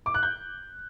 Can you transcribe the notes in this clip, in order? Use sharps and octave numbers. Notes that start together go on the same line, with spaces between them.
D6
F#6
G6